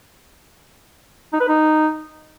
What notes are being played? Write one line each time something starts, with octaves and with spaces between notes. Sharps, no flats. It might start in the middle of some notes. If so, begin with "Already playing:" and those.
D#4
B4
D#4